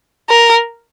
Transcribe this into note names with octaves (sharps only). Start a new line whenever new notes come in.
A#4